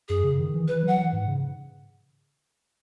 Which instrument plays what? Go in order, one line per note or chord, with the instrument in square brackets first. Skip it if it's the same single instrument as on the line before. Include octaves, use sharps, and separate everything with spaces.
[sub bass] F#2 [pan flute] G#4
[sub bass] C#3
D#3
E3
[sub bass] E3 [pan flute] B4
[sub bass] F#3 [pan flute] F#5
[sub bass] E3
G#2
C#3